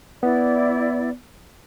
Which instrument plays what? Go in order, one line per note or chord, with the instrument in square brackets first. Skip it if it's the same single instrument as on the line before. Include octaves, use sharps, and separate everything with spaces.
[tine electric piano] B3 [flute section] E4 D5